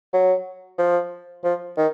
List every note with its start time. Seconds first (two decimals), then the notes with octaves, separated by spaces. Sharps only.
0.14 F#3
0.78 F3
1.44 F3
1.77 D#3